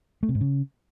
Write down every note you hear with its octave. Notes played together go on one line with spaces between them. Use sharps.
A3
C3
G#2
C#3